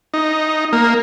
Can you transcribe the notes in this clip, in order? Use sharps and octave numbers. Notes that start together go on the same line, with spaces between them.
D#4
A#3